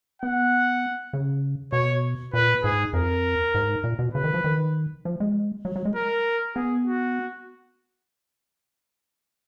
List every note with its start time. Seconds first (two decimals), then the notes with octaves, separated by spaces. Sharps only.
0.22 B3 F#5
1.13 C#3
1.73 B2 C#5
2.34 A#2 B4
2.63 G#2 G#4
2.93 F2 A#4
3.54 G#2
3.84 A#2
3.99 B2
4.14 C#3 B4
4.24 D#3
4.34 F3
4.44 D#3
5.05 F3
5.20 G#3
5.65 F#3
5.76 F#3
5.85 G#3
5.96 A#4
6.55 B3 G#4
6.85 F#4